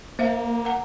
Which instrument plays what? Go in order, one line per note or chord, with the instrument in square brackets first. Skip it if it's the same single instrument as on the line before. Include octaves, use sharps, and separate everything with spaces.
[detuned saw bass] A#3 [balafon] C5 E5 F5
[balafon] F#5 A#5